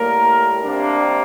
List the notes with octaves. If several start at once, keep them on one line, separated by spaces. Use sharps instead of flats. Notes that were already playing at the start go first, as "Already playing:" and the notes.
Already playing: A2 G3 A#3 A#4
C3 G3 A#3 D4